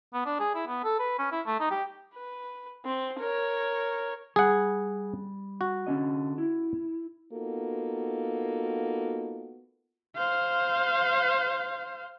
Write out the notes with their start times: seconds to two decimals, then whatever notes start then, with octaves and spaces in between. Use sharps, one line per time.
0.14 B3
0.26 D4
0.40 G#4
0.55 E4
0.67 B3
0.84 A4
0.99 B4
1.19 C#4
1.32 E4
1.47 A3
1.60 D#4
1.71 G4
2.14 B4
2.85 C4
3.19 A#4 C#5
4.36 G3 G#4 F#5
5.61 F#4
5.87 D3 C#4 D#5
6.38 E4
7.32 A#3 B3 D#4 F4 F#4 A4
10.15 C5 F5